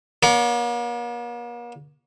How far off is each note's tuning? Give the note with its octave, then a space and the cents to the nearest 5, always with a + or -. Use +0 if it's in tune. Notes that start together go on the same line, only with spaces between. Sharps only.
A#3 +45 C#5 +45